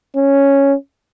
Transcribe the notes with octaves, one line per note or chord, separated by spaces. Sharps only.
C#4